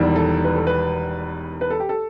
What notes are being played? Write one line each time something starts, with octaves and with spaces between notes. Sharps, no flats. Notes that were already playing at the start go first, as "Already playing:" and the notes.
Already playing: E1 E2 D#3 G3
A4
B4
A4
B4
B4
A4
G4
A4